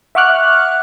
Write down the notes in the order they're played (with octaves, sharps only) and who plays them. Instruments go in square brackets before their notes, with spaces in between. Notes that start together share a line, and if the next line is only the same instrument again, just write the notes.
[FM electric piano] E5 F#5 C#6 D6 F6 F#6